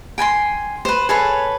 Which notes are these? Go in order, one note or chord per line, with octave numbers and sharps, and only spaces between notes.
G5 G#5 B5 C6
B4 C5
G#4 A4 B4 C#5